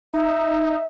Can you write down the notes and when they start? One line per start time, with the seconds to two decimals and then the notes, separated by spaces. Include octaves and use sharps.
0.14 D#4 E5